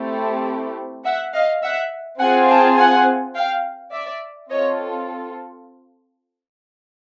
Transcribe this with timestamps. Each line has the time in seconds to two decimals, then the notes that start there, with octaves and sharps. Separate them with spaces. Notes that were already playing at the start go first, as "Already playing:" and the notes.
Already playing: A3 C4 E4 G4
1.04 E5 F#5
1.33 D#5 F5
1.62 E5 F#5
2.20 C4 F4 G#4 F#5 G#5
2.48 G5 A5
2.77 F#5 G#5
3.35 F5 G5
3.92 D5 E5
4.50 C4 F4 A4 C#5 D#5